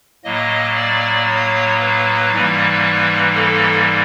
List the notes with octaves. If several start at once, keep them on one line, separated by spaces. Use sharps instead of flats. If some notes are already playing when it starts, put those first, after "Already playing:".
A2 F#3 A#3 D#5
D5
C#5
B4
G#2 E3 G3 A#3
A4